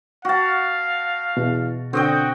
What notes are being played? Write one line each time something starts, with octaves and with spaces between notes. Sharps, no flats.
F#4 F5 A5
E2 B2
D3 C4 F#4 D#5 G5